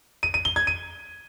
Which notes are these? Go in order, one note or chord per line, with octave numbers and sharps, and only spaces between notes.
D#7
D#7
G7
G#6
D#7